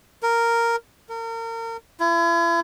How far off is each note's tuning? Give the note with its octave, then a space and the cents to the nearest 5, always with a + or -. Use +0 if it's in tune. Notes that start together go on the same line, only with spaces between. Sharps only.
A#4 -5
A#4 -35
E4 +40